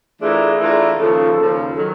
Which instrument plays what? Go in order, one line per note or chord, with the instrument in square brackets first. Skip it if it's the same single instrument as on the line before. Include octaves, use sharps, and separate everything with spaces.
[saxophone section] E3 A3 D4 F4 A#4 [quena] G#4
[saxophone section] E3 A3 D4 F4 A#4
[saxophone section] D#2 C#3 F3 [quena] A4
[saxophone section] D#2 C#3 F3
[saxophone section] D#3 F#3 [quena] A4